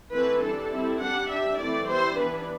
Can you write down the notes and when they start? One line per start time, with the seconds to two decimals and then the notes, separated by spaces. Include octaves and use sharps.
0.13 E3 A3 C4 E4 B4
0.42 G3 D4 A4
0.71 G3 C4 E4
1.00 G3 D4 F#5
1.29 G3 D4 E5
1.57 E3 A3 C4 E4 D5
1.87 G3 B3 E4 C5
2.16 E3 B3 D4 B4